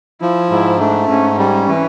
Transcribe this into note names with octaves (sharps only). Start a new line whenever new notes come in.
F3 E4
G#2 E4
A3 D4
G#2 C#4
G3 C#4
E3